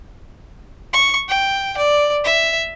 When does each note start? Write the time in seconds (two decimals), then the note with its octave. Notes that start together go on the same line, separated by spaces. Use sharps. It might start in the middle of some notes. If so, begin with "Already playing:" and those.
0.93 C#6
1.29 G5
1.77 D5
2.24 E5